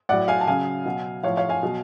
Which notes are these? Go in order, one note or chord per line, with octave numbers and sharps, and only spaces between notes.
A2 F#3 D5 F#5
F5 G#5
A5
C#3 F#3 F5 G#5
B2 F#3
A2 F3 C#5 F5
C#5 F5
F5 G#5
B2 F#3